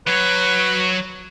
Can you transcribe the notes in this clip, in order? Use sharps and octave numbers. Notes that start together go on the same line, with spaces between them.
F#3 B4 C#5